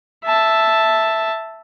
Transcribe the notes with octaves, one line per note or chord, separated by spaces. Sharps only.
E5 A5